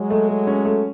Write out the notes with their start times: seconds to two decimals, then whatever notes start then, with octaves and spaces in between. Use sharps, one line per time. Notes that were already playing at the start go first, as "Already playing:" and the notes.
Already playing: F#3 G#3
0.10 A3
0.29 A3
0.47 C#4
0.65 A3